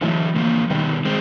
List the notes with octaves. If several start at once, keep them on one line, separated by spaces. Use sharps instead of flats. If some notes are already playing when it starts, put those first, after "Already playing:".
D3 E3 F#3 A3
D3 F3 A#3
B2 D#3 G3 B3
G#3 C4